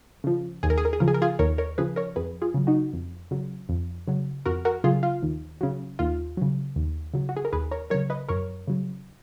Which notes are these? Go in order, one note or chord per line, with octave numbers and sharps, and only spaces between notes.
C#3 F3
D#2 G#4
A#4
G#4
A#4
G#4
C#3 F3 A#4
G#4
A#4
F4 G#4
D#2 A#4 C#5
A#4 C#5
C#3 F3 G#4 B4
A#4 C#5
F2 G#4 B4
F4 G#4
C#3 F#3
D#4 F#4
F2
C#3 F#3
F2
C#3 F#3
F2 F#4 A#4
F#4 A#4
C#3 F#3 F4 G#4
F4
D#2
C#3 F#3
D#2 F4
C#3 F#3
D#2
C#3 F#3
F#4
G#4
A#4
D#2 G#4 B4
A#4 C#5
C#3 F#3 A#4 C#5
B4 D#5
F#2 A#4 C#5
C#3 F#3